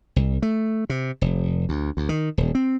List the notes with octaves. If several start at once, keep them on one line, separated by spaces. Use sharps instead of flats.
C2
A3
C3
F1
D2
D2
D#3
D#1
C4